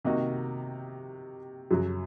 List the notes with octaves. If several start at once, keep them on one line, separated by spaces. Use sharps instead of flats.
C3 D#3 A#3 D#4 F#4
F#2 C#3 F#3